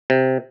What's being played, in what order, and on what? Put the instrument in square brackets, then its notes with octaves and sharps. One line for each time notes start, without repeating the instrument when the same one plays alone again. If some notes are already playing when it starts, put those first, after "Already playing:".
[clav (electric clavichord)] C3